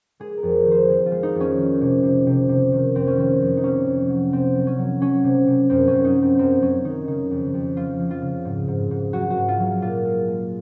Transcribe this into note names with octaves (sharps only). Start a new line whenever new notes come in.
G#3 G#4
A#4
F2
D#3
C5
D#3 G#4
F4
G#3
D#4
F2
C#4
D#3
C3
C3
C3
C3
D#3
F2 C4
C#4
D#3 C4
F2
D#4
C3 C#4
F2
F#3
C3 C4
F#3
C#4
F#3
F#3 C#4
C3
C3
F#2 C4
C#4
F#2
D#4
F#3
C4
F#2 C4
F#2 C#4
D#3 D#4
C#3 D#4
F2
F2
F3 F4
F3
F4
C#3
G#2
G#2
G#2
F#3 F#4
F#4
G#2
F4
F#3
A#2 F4
G#3
G#3